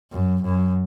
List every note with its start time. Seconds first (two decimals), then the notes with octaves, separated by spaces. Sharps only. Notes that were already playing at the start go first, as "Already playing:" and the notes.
0.12 F#2
0.44 F#2